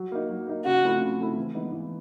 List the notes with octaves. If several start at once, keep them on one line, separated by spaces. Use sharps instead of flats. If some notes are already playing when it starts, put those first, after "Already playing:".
Already playing: F#3
A#3 D#4
F#3
A#3 D#4
C#3 F#4
F3 A3 C4 E4
C#3
F3 A3 C4 E4
E3
G#3 B3 D#4
E3